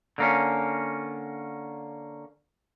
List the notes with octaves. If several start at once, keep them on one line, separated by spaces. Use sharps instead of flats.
D3 A#3 C#4